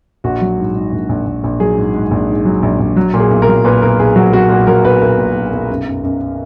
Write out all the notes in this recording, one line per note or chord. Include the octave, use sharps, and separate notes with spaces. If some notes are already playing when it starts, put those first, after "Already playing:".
A#1 F#4
F#3
G#2
G#2
A#1
A#1
A#1
A#1
F#3 G#4
G#2
G#2
A#1
G#2
F#3
A#1
A#1
F#3
A#2
G#4
B1
A#4
F#3
A#2 B4
B1 A#4
B1 G#4
F#3 F#4
F#3 F#4
A#2 F#4
F#3 A#4
B1 B4
B1 A#4
A#2
B1
B1
F#2
F#2
F#2